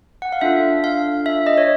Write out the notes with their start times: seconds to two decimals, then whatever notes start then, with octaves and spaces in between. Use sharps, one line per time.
0.22 F#5
0.32 F5
0.41 D4 F4 A4 E5
0.84 F5
1.26 E5
1.47 D#5
1.58 C#5